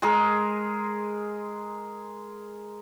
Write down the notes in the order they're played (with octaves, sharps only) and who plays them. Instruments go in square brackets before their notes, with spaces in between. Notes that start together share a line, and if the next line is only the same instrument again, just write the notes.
[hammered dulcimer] G#3 G#4 A#4